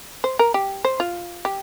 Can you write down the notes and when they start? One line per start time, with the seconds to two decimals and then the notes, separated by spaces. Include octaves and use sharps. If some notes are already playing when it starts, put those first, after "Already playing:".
0.24 C5
0.39 A#4
0.54 G4
0.85 C5
1.00 F4
1.45 G4